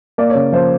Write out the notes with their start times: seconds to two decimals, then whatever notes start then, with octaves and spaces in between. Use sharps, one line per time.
0.18 A#3 D5
0.30 C#5
0.35 C#3
0.52 F3 C5